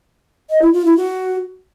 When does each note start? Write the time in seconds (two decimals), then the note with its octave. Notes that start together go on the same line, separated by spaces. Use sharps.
0.50 D#5
0.62 E4
0.73 F4
0.85 E4
0.97 F#4